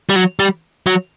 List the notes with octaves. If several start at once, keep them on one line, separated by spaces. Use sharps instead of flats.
G3
F#3
G3
F#3